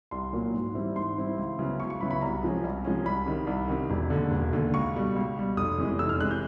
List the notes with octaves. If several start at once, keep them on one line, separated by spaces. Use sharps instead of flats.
C2 C6
A#2 F#3 A#3
G#2
E3 G3 C4 E4
G#2 C6
E3 G3 C4 E4
C#2
C#3 F#3 B3 E4
C#2 C#6
C#6
C#3 F#3 B3 E4 B5
B5
C2 A#5
C3 F3 G#3 C#4
C2
C3 F3 G#3 C#4
C2 B5
C3 D#3
C2
C3 D#3
E1
D3
D#2
E1
D#2 D3
C#2 C#6
B2 G3
C#2
B2 G3
F1 D#6
E2 C3 E3 G#3
F1 E6
F6
C3 E3 G#3 F#6
G6